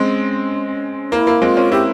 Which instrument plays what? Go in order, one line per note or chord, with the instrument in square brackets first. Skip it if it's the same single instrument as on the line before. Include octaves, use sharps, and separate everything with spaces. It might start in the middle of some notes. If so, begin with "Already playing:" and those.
Already playing: [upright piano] G#3 C4 [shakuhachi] C#4
[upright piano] A#3 [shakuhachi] E4
[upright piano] A#3
[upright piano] G#3 C4 [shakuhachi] F4
[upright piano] A#3 C#4
[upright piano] C4 E4 [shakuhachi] G4